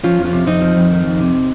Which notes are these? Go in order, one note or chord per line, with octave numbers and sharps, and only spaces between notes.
F3 C#4 F4
F2
C#4 F4
C3
F2 C4 D#4
F3
F2
D#3
F2
C3